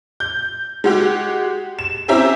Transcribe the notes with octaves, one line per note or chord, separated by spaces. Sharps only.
G6
G#3 F#4 G4
E7
C4 C#4 E4 G4 E5 A#5